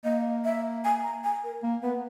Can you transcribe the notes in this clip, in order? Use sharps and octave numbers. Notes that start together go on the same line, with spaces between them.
A#3 D#5
E5
G#5
A#5
G#5
A#4
A#3
B3 B4